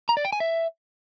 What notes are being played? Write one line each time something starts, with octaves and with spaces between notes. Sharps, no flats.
A#5
D5
G5
G#5
E5